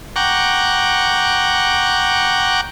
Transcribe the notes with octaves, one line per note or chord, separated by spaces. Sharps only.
F#5 G5 A#5 C#6 D6